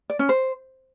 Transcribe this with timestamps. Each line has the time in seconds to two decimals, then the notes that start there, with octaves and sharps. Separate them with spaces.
0.10 D5
0.19 C#4
0.29 C5